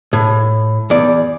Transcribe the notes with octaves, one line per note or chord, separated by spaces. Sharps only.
A2
E2 D5